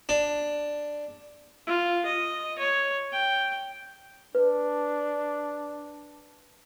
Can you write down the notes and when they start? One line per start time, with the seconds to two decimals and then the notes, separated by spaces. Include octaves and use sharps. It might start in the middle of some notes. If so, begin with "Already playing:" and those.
0.09 D4
1.67 F4
2.06 D#5
2.58 C#5
3.13 G5
4.35 D4 B4